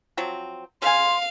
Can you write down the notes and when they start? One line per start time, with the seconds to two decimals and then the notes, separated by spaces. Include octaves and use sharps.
0.17 F3 F#3 C4
0.82 C#3 F5 G#5 C6